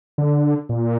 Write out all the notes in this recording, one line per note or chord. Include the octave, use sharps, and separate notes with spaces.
D3
A#2